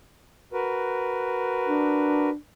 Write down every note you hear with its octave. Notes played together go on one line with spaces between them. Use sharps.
F#4 A#4 B4
D4